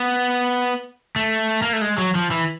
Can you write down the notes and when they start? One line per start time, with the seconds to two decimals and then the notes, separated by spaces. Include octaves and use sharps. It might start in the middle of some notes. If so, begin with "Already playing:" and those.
Already playing: B3
1.16 A3
1.62 A#3
1.73 A3
1.82 G#3
1.98 F#3
2.15 F3
2.31 E3